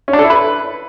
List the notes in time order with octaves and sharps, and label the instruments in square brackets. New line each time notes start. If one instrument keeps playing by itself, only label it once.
[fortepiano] C#4
D4
A4
E4
B4